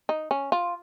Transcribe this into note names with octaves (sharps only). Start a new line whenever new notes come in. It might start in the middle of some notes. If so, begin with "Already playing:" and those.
D#4
C#4
F4